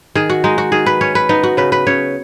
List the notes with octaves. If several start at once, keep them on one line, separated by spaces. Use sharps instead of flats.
D#3 G#4
F#4
G#3 D#4
F#4
D#3 G#4
B4
C#4 C#5
B4
B3 D#4
F#4
C#3 B4
B4
C#3 C#5